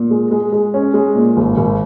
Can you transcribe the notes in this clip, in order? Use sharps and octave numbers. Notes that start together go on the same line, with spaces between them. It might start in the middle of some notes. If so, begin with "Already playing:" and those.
Already playing: A#2
G#3
G#3
G#3
C#4
G#3
A#2
G#1
G#1